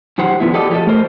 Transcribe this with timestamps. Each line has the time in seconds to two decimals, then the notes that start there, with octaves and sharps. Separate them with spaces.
0.18 F#2 D#3 G4 C5 F#5
0.40 D3 F3 A#3 B3 E4
0.54 G4 A4 D5 D#5
0.70 F3 F#3 A3 G4 A4 D#5
0.87 A3 A#4 C5 D#5